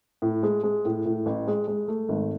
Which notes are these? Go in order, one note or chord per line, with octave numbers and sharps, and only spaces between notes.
A2
G#3
G#3
A2
A2
A1
G#3
G#3
A3
G#1